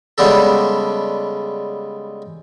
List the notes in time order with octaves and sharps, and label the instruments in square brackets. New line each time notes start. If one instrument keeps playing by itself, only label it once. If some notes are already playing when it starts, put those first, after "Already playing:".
[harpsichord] C#3 G3 G#3 B3 D4 A4